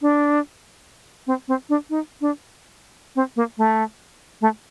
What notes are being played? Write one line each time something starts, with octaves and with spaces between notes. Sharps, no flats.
D4
C4
C4
D4
D#4
D4
C4
A#3
A3
A3